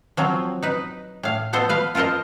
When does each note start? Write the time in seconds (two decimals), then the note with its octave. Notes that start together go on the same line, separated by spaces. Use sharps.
0.17 F3 F#3 C4
0.63 D#4 B4
1.23 A2 F5
1.53 F3 B3 A4 C5 D#5
1.69 B4 F5
1.95 F4 A4 A#4 C5 D#5